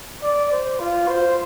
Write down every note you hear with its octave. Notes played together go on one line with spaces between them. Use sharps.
D5
C5
F4
C5